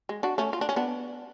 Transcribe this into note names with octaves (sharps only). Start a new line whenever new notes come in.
G#3
D4 F#4
A3 C#4
F4
D4
C#4
B3 D4